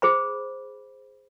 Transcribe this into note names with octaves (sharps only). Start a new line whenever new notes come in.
G#4 C5 B5